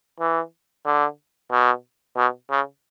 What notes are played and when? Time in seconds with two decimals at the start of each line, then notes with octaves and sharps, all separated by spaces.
0.20 E3
0.86 D3
1.52 B2
2.17 B2
2.51 C#3